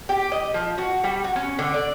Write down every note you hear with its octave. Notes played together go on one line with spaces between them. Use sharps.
G4
D#5
F3
F#4
G3
F#4
C#4
D3
D5